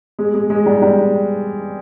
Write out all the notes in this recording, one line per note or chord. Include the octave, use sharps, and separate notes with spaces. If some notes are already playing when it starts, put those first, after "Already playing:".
G#3
G#3
G#3
G3
G3